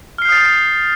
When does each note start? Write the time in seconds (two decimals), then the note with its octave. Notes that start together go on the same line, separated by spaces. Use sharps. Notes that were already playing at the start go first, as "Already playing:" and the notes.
0.18 F6
0.22 C7
0.25 G6
0.29 D#6
0.32 A6